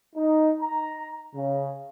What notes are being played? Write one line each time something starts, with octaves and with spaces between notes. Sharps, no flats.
D#4
A#5
C#3